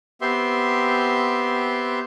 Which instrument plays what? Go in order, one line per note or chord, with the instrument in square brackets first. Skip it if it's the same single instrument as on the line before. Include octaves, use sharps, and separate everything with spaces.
[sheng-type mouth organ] B3 C4 G4 E5 C6